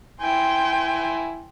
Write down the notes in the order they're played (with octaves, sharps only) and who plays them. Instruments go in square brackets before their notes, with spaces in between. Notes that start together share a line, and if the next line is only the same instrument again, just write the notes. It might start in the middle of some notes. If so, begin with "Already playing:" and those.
[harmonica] E4 G#5 [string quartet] G5 C6